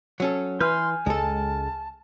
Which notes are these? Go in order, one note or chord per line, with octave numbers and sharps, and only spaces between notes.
F#3 C#4 A4
E3 B4 G#5 C6 F6 G6
C#2 G#3 A4 A5